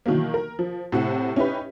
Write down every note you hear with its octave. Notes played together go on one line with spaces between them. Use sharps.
B2 D#3 E3 F#3 A#3
A#4
F3
A2 C3 F#5
C#4 D#4 E4 G4 B4